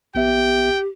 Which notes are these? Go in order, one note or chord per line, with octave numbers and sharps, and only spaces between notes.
A#1 B3 G4 E5 G5